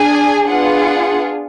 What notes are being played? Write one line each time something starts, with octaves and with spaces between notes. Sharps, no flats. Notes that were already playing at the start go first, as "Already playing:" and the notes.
Already playing: D4 G#4 G#5
B3 D4 F4 G#4 F#5